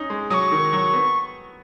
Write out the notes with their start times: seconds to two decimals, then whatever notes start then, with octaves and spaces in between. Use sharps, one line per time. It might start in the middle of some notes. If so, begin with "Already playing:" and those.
Already playing: C#4 D#4
0.10 G#3
0.30 F#3 D#6
0.34 C#6
0.52 D#3
0.73 F#3
0.93 B3